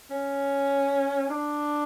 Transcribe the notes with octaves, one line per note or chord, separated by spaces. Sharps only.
C#4
D4